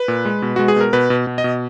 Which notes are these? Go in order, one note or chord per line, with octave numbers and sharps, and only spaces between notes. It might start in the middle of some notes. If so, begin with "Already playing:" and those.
Already playing: B4
A#2
G#3
B2
G#3 F#4
G#4
B2 A#4
B2 B4
B2
B2
D#5
B2